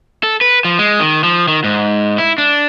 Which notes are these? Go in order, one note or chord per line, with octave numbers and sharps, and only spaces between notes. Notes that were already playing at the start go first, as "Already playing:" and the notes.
A4
B4
F3
G#3
D#3
F3
D#3
G#2
E4
D4